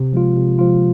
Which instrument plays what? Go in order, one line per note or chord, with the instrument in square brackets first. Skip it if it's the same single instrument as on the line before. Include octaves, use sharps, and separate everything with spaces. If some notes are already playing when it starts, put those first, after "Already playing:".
Already playing: [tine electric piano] C3
F3 G#3 F4
C3
F3 G#3 F4